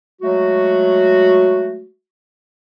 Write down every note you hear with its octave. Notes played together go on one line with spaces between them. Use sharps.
F#3 G#3 A3 F#4